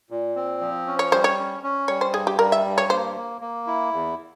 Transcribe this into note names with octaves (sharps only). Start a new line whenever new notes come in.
A#2
C4
F3
C#4
C#5
G3 C5
C#5
C#4
C#4
G3 C#5
C5
G2 G#4
G4
G3 A#4
E5
G2
C#5
A#3 C5
A#3
A#3
E4
E2